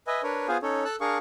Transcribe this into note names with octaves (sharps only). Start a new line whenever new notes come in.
B4 D#5 E5 G#5
D4 A#4 B4 C#5
B3 F4 G#4 C5 F5 G#5
C#4 D#4 A4 C#5
A4 A5 E6 F#6
D4 G#4 A#4 F5 C#6